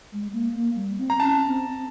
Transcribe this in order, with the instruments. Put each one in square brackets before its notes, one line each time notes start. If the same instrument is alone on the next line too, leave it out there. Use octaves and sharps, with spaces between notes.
[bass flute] G#3
A#3
A#3
G3
C4
[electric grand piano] A#5
[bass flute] C#4 [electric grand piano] A5
[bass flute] C4